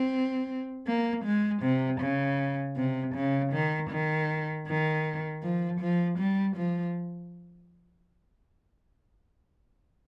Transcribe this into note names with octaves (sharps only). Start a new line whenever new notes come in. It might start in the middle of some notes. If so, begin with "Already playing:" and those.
Already playing: C4
A#3
G#3
C3
C#3
C3
C#3
D#3
D#3
D#3
F3
F3
G3
F3